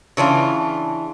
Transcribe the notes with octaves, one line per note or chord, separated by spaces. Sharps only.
C#3 E3 D4 F4